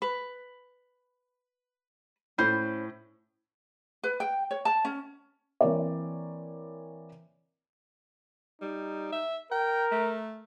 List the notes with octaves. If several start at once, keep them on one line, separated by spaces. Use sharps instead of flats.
B4
A2 C#4 C5 B5
B4
G5
C#5
A5
C#4
E3 A#3 C4 A#4 C#5 D5
G3 D#4
E5
A#4 G5
A3